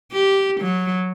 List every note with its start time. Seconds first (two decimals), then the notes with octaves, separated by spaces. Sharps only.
0.12 G4
0.61 F#3